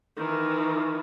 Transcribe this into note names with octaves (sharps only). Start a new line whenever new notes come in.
D#3 E3